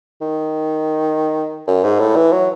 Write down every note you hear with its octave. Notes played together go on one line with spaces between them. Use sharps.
D#3
F#2
G#2
A2
E3
F#3